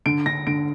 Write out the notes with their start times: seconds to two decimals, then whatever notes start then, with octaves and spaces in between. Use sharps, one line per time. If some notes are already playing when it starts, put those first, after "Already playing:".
0.06 D3 D7
0.26 D3 A#6
0.47 D3 D7